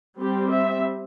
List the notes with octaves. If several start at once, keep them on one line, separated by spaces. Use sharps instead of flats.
G3 C4 G4
E5